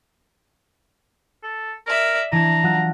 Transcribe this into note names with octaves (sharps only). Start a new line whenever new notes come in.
A4
A#4 D5 E5
E3 D4 E4 A#5
F#3 F4 F#4